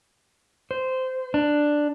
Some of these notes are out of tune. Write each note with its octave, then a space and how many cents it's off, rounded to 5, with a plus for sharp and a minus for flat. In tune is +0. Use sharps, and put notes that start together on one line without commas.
C5 -15
D4 +5